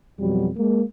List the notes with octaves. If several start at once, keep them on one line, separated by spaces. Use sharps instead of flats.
F2 B2 F#3 G3
G#3 A#3